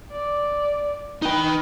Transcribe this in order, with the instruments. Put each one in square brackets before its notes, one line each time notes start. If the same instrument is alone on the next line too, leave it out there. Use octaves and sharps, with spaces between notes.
[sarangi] D5
[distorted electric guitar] D#4 G5 [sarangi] B4